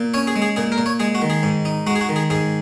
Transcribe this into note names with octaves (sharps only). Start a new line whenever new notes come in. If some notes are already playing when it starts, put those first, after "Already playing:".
Already playing: A#2
C#4 C#5
G#4
G#3
G#4
A#2 G#4
A#4
A#2
C#5
G#3 G#4
F#4
D#3
G#4
G#2
D#4
G#3 F#4
G#4
F#4
D#3
G#4
G#2 G#4